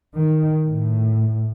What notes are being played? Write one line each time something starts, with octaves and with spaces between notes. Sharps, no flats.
D#3
A2